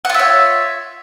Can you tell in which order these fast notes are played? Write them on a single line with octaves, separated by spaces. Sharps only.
F#5 F4 E5 C#5